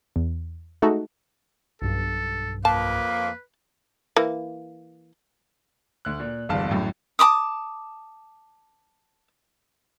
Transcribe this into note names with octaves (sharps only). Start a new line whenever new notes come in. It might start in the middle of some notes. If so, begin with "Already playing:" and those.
E2
G#3 A3 D#4 F#4 A4
B1 G2 A4
F2 A#3 B4 A5
E3 A#3
D2 F#6
A#2
D1 G1 E2 G2 F5 A5
G#1 F#2 A2
A5 B5 D6 D#6